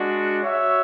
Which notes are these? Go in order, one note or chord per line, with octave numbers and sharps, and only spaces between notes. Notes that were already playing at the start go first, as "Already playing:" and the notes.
Already playing: G#3 D4 F#4
F#4 C#5 E5